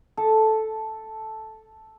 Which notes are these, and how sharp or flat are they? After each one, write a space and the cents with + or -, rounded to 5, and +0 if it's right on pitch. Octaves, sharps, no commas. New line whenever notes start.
A4 -5